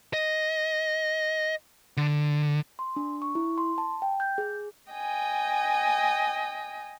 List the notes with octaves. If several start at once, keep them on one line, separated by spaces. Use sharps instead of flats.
D#5
D3
C6
D4
C#6
E4
C6
A5
G5
G6
G#4
D#5 G5 G#5